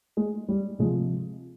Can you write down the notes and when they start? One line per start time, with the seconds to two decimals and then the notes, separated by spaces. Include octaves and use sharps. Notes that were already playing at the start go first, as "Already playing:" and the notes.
0.17 G#3
0.49 G3
0.79 C3 F3 G#3